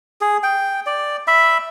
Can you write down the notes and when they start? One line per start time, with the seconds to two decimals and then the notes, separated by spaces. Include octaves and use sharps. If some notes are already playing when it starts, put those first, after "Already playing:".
0.21 G#4
0.43 G5
0.86 D5
1.27 E5 B5